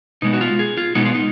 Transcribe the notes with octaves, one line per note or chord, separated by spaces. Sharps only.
B2 G#3 B3 D#4
F#4
F4
G#4
F4
B2 G#3 B3 D#4
F4
D#4